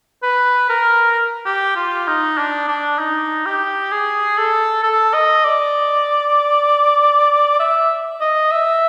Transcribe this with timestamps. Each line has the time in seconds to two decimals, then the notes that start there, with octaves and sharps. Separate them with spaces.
0.23 B4
0.70 A#4
1.46 G4
1.76 F4
2.08 D#4
2.38 D4
2.68 D4
2.99 D#4
3.46 G4
3.92 G#4
4.38 A4
4.83 A4
5.14 D#5
5.44 D5
7.60 E5
8.21 D#5
8.52 E5